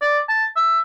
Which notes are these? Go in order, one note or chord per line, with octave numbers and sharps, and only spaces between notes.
D5
A5
E5